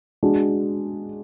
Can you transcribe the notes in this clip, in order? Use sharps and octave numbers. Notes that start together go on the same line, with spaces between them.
G#3 D4 F#4